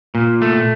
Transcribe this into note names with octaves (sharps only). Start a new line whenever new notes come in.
A#2
A3